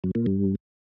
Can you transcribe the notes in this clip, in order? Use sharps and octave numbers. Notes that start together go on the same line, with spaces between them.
F#2
A#2
G2